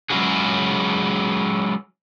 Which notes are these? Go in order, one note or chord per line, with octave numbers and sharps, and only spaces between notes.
F#3 G#3 C#4 E4 F#4 G#4